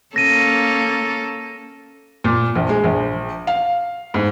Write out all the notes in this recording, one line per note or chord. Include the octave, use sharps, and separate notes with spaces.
A#3 C#4 A4 A#6 D#7
A#2
A#1
G#3
A#1
F5
G#2